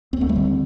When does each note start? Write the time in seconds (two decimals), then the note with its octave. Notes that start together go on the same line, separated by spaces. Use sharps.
0.13 D2 C4
0.21 A3
0.29 G3 C4
0.36 D3